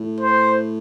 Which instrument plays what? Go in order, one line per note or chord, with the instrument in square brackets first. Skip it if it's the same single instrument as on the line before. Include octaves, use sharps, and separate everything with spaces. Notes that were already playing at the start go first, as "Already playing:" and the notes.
Already playing: [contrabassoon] A2
[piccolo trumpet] C5